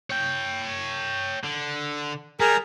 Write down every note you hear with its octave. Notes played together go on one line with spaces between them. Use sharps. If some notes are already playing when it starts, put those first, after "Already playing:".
C#5 G5
D3
G3 G#4 A#4 A#5